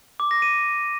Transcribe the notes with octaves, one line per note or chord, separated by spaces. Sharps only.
D6
A#6
D#7